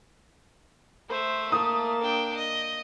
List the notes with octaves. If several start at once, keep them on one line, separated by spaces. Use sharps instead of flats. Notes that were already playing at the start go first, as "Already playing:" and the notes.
A3 C5 E5
A#3 A5 D#6
D4 G5
D#5